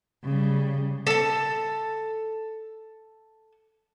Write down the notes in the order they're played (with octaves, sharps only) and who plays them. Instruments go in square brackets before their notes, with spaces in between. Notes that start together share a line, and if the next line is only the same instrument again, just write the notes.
[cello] C#3 G3
[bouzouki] A4 A5